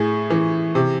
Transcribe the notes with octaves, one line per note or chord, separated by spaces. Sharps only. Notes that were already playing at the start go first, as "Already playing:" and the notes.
Already playing: A2 G#4
E3
C3